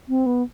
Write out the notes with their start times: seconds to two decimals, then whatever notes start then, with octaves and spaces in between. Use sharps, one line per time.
0.09 C4
0.26 B3